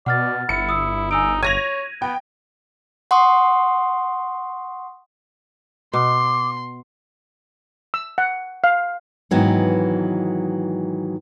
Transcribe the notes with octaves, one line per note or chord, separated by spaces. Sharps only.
B2 D5 F#5 F6 A6
G1 E4 C#7
D#6 E6
D#4 G#5 E6 D7
C#5 G#6 A#6 D#7 F7
B3 G5
F#5 C6 C#6 D#6
B2 C6 D6
E6
F#5
F5
G#2 D#3 E3 F#3 B3